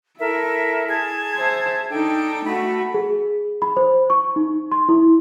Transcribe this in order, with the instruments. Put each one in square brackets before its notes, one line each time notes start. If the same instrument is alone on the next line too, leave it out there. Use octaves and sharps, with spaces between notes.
[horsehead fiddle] E4 [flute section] A4 A#4 E5
[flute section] G#4 A5 G#6
[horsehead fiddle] C5 E5
[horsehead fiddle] D4 D#4 [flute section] A4 G5
[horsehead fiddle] A3 F#4 [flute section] B5
[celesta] G#4
B5
C5
C#6
D#4
C6
E4